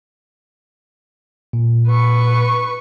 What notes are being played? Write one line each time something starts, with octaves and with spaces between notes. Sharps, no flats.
A#2
B4 C#6